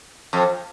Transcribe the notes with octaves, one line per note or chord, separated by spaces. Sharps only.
F2